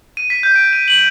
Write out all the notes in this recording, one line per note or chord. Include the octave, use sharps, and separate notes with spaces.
D#7
B6
G6
D7
D#7
F#7